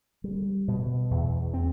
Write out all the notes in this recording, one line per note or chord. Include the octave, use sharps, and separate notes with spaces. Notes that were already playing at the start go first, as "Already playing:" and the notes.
G3
B2
E2
C4